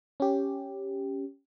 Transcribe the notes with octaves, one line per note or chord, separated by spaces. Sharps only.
C#4 G4